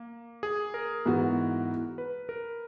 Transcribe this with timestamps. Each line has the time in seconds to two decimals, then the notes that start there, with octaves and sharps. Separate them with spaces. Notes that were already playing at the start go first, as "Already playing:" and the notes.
Already playing: A#3
0.43 G#4
0.74 A#4
1.05 G#2 E3 B3 F#4
1.98 B4
2.29 A#4